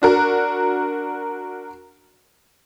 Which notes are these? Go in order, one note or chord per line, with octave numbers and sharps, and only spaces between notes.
D4 F#4 A#4